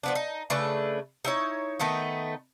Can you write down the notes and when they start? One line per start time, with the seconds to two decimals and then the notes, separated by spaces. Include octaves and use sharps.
0.03 F3 B3 D4
0.15 D#4
0.50 C#3 A3 D4 B4
1.25 D#4 E4 C#5
1.79 D#3 A3 B3 D#4